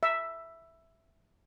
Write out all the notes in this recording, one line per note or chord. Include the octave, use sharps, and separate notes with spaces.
E5